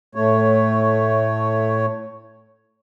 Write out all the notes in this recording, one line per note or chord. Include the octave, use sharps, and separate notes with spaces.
A2 A3 C#5